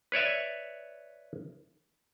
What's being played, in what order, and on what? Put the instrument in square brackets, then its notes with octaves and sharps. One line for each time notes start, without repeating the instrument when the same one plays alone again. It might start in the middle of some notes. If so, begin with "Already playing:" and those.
[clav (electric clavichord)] B4 C#5 D5 E5